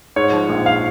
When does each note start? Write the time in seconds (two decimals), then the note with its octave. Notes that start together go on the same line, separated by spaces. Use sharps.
0.16 G#2 C#5
0.32 F3
0.49 A#1
0.66 F5